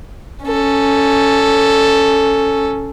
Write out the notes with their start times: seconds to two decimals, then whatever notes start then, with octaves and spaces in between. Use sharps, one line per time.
0.45 C#4 A4